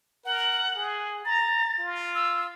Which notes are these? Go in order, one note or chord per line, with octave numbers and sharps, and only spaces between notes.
A#4 F#5
G#4
A#5 A6
F4
E6